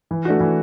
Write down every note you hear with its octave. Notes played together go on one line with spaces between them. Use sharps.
E3
A3 D4 F#4
E3